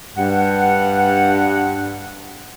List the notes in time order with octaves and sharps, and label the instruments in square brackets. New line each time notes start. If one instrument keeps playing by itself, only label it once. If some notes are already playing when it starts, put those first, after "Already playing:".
[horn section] G2 F#5